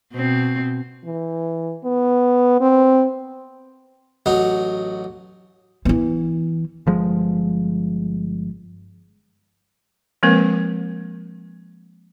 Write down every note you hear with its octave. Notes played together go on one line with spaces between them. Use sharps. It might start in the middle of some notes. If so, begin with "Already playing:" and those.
B2 C4
E3
B3
C4
A1 F#3 D#4
E3 B3
G1 F3 G#3
F3 G#3 A#3 C4 A#4 B4